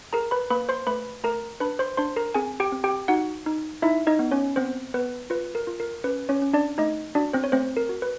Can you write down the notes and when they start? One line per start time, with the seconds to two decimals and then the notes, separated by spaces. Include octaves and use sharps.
0.13 G#4 A#4 A#5
0.31 B4 B5
0.50 A#3 B4 B5
0.69 C5 C6
0.87 A3 B4 B5
1.24 A3 A#4 A#5
1.60 D4 B4 B5
1.79 C5 C6
1.97 D4 C5 C6
2.16 A#4 A#5
2.34 C4 G#4 G#5
2.60 G4 G5
2.72 C4
2.84 G4 G5
3.08 D#4 F#4 F#5
3.46 D#4
3.82 D#4 E4 E5
4.07 D#4 D#5
4.19 B3
4.31 C#4 C#5
4.56 B3 C4 C5
4.94 B3 B4
5.30 F4 B4
5.55 A#4
5.67 F4
5.80 A#4
6.04 C#4 B4
6.29 C#4 C#5
6.42 C#4
6.53 D4 D5
6.78 A3 D#4 D#5
7.15 D4 F#4 D5
7.33 C4 C5
7.44 C#5
7.52 A3 C4 C5
7.77 A#4
7.89 F#4
8.02 B4